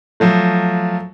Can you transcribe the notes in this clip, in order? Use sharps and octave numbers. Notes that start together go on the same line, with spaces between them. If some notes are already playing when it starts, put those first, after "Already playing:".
F3 F#3 A3